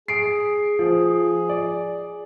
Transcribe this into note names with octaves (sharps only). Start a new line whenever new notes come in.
G#4 C7 D7
F3
D5